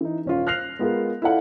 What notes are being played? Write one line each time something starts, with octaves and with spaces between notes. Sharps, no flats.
E3 D#4
D#1 C#4 F4
F6 F#6 A#6 C7 F7
G#3 B3 F4 G#4 A#4
E4 F4 A4 D5 F5 F#5